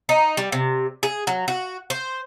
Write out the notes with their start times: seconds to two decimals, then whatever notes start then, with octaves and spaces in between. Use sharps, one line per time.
0.09 D#4
0.37 G3
0.52 C3
1.03 G#4
1.27 F#3
1.48 F#4
1.90 C5